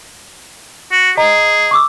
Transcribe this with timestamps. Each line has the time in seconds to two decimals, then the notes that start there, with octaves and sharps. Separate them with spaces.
0.92 F#4
1.17 G#4 D#5 A#5
1.71 C#6 D6 E6